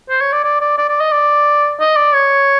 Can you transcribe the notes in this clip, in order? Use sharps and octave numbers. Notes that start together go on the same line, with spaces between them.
C5
C#5
D5
D5
D5
D5
D5
D#5
D5
D#5
D5
C#5